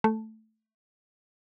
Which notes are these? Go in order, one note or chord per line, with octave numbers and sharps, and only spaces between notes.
A3